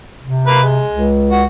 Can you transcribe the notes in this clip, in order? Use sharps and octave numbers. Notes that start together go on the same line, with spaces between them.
C3
A#3 B4
G#3
C#2
F#4